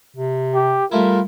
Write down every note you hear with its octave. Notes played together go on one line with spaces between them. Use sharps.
C3
G4
G3 A3 E4 F4 A#4